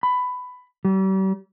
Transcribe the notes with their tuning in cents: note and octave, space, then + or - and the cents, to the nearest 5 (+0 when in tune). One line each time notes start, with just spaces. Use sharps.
B5 +15
G3 -40